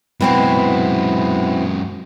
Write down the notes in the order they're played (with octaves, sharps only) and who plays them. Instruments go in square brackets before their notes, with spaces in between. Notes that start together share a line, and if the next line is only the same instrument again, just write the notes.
[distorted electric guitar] F#2 G#3 [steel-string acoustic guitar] B2 C4 E4